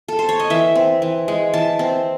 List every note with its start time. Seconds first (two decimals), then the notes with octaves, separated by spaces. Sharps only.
0.08 A4
0.19 C5
0.29 C#5
0.40 D#5
0.50 E3 E5
0.75 C4
1.02 E3
1.28 G#3
1.54 E3 A5
1.79 C4